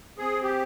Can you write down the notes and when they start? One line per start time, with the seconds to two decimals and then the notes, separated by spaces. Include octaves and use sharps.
0.18 C4 G#4
0.43 G4